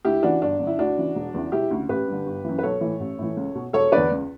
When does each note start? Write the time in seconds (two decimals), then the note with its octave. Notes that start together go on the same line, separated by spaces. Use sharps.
0.05 D2 E4 G4
0.23 C#3 E3 D4 F#4
0.42 G1 D4
0.60 F#2 D3
0.67 E4
0.78 D2 D4 F#4
0.97 C#3 E3
1.15 E1
1.34 E2 C#3 E3
1.52 E1 E4 G4
1.71 D2 C#3
1.89 A1 G4 B4
2.08 G2 D3
2.26 G1
2.44 F#2 E3
2.59 B4
2.63 B1 A4 C#5
2.81 A2 E3
3.00 A1
3.18 A2 E3
3.37 C#2
3.55 B2
3.73 E1 A4 C#5
3.92 E2 D3 B4 D5
4.11 C#2